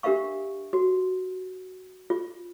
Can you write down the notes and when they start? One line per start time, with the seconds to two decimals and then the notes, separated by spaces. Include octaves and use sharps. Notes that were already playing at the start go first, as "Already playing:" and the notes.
0.03 D4 G4 A#4 E5 F5 C#6
0.73 F#4
2.10 F4